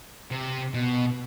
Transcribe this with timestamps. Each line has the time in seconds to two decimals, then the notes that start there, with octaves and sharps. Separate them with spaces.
0.31 C3
0.74 B2